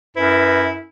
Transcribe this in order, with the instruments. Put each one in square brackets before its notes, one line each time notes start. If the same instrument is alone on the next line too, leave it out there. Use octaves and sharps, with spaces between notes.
[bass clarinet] F#2 [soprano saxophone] E4 [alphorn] B4